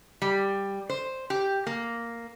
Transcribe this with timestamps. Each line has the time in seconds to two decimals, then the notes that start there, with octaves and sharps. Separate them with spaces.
0.22 G3
0.90 C5
1.30 G4
1.67 A#3